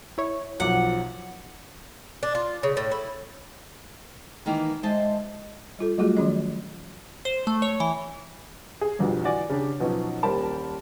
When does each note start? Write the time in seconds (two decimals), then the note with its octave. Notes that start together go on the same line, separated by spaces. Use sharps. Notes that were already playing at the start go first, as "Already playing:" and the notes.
0.18 E4 C#5
0.60 B1 F3 F#3 F#5 D6
2.23 D4
2.35 F4
2.63 C#3
2.77 A2
2.91 E4
4.46 D#3 E3 A#3
4.83 G#3 C5 D#5 E5 A5
5.79 G3 F4 A4
5.98 F#3 G3 A3 F4 F#4 G#4
6.17 D#3 F3 F#3 C#4 G#4 D#5
7.25 C5
7.47 A3
7.62 C#5
7.80 E3
8.81 G#4
8.99 G1 C2 F2 B2 D3
9.24 E3 F#4 D5 G#5
9.49 C#3 C#4 D4 G4
9.80 B2 F3 F#3 B3 C#4 D#4
10.23 D#1 C2 A#4 C5 A5 B5